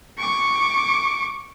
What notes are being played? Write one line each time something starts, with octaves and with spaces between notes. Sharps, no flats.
C#6 D6